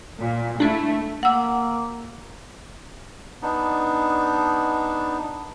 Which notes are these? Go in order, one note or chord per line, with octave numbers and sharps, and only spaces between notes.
A#2
A3 D4 E4
A#3 F#5 E6
B3 D4 D#4